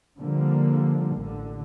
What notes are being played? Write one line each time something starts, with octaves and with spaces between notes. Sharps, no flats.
D3 F3 G3 A#3
A1 D3